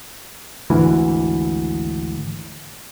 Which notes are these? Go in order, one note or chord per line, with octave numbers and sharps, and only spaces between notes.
G#1 D2 E3